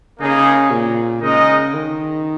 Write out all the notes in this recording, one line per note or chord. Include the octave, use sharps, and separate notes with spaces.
C#3 A#3 D#4 G#4
A#2
C#3 G#3 D#4 A#4 D#5
D#3